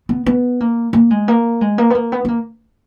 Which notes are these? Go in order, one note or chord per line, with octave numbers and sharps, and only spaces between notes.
B3
B3
A#3
A#3
G#3
A#3
G#3
A#3
B3
A#3
B3
B3
A#3